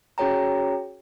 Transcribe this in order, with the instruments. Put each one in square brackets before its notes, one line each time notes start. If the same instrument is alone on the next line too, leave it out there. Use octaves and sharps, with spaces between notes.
[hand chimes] C#4 F#4 G#4 C#5 G5 A#5